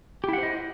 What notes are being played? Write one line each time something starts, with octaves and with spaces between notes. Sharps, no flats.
E4 G4 C5 D#5 F#5